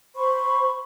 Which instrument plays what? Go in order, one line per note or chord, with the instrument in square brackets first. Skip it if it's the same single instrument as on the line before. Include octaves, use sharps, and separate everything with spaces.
[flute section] C5 B5 C#6